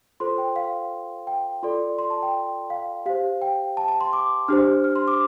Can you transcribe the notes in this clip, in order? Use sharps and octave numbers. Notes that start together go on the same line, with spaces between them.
F4 A4 C5 C6
G5
F5
G5
F4 A4 D5 C6
C6
A5
G5
F5
G4 C5 F5
G5
A5
A5
C6
D6
D4 G4 C5 F6
F6
C6
D6